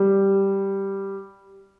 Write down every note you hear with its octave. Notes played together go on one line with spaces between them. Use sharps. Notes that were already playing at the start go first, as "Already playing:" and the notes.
Already playing: G3